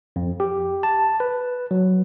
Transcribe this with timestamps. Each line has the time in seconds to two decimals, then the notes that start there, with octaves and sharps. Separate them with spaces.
0.16 F2
0.40 G4
0.83 A5
1.20 B4
1.71 F#3